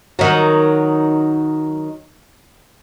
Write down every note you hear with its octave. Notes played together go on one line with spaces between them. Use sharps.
D#3 F#3